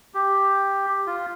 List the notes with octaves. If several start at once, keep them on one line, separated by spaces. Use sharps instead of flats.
G4
F4